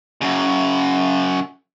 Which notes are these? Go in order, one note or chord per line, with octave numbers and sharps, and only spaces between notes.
F#2 C#3